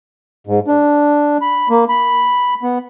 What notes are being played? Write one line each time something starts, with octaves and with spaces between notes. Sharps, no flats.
G#2
D4
B5
A#3
B5
B3